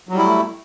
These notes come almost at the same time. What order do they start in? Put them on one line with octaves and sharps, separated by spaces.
F#3 G3 E4 A3